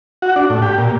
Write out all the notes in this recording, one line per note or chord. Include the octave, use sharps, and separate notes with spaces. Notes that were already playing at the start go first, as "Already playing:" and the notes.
F#4
D4
A2
G4
A#2